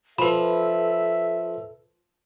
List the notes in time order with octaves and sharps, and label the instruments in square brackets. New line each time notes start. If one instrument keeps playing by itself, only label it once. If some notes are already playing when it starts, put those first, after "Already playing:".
[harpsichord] F3 [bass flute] A4 [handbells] B4 B5 [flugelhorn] E5